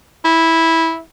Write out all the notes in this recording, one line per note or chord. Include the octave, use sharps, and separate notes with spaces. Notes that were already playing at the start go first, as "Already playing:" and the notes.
E4